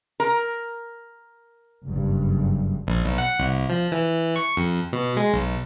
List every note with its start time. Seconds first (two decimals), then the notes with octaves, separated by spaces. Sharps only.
0.20 A#4
1.86 F#1 G2
2.87 A#1
3.05 B1
3.18 F#5
3.39 C2
3.70 F3
3.92 E3
4.36 C#6
4.57 F2
4.93 B2
5.17 G#3
5.33 B1